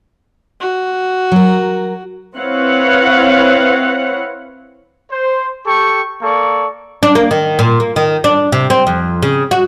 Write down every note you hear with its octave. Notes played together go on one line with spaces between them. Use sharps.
F#4
F#3 A#4
C4 E4 B4 C#5 F5 F#5
C5
G4 A4 G5 C#6
A#3 A4 D5 C#6
D4
A#3
D#3
A#2
A#3
D#3
D4
C3
C4
F2
C#3
F#4